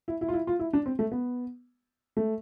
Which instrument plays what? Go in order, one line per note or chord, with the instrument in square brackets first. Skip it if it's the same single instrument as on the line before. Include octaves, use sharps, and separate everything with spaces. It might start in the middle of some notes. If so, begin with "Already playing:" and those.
[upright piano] E4
E4
F4
E4
F4
E4
D4
C4
A3
B3
A3